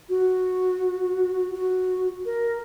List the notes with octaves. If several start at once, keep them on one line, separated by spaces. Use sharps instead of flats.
F#4
F#4
A#4